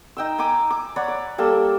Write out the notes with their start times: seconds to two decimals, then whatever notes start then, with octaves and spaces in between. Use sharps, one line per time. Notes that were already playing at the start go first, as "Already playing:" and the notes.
0.17 D#4 G5 E6
0.38 G#5 A#5 B5 D6
0.70 D6
0.96 C#5 D5 F#5 B5
1.08 D6
1.38 G3 A#3 A4 E6